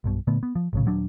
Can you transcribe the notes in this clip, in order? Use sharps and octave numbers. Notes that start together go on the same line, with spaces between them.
B1 G2 B2
A#2 D3 A3 B3
B3
F3
A#1 A2 C#3
D#1 F#3 D4